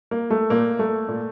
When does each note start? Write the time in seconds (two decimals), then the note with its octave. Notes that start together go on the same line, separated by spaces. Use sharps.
0.11 A#3
0.30 A3
0.50 A#2 A#3
0.79 A3
1.08 A#2